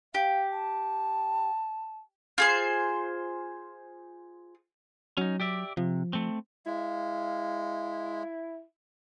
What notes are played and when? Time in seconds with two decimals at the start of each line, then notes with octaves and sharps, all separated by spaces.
0.14 G4 F5
0.50 A5
2.38 F4 G#4 C5
5.18 F#3 C#4 D#4
5.40 G4 D5 E5
5.77 C3 F3
6.13 A3 C4
6.66 G#3 E4 F5